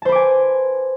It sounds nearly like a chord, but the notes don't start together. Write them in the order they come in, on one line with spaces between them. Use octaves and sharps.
A5 C5 B4 D6 G#5